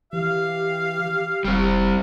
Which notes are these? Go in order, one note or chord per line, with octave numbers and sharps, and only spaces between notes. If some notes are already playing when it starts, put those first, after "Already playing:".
E3 G4 F5
F1 G3 C4